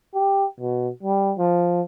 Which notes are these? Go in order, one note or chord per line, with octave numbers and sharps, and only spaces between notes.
G4
B2
G3
F3